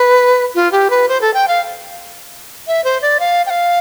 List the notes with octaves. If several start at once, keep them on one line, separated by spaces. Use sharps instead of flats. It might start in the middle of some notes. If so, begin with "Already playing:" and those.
Already playing: B4
F4
G4
B4
C5
A4
G5
F5
E5
C5
D5
F5
G5
F5